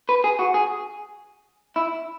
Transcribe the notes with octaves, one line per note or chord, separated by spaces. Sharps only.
B4
G#4
F#4
G#4
E4